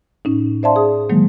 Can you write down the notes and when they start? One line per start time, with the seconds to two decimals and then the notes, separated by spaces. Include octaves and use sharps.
0.25 A2 C#4 D#4
0.63 C5 D5 E5 F5 A5 C6
0.76 G#4 D#6
1.10 D#3 E3 F#3 G#3 A#3